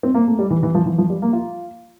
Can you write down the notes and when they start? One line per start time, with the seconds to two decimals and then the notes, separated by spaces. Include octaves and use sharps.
0.03 C4
0.15 A#3
0.27 A3
0.39 G3
0.50 E3
0.63 E3
0.75 F3
0.86 E3
0.98 F3
1.10 G3
1.22 A#3
1.33 F4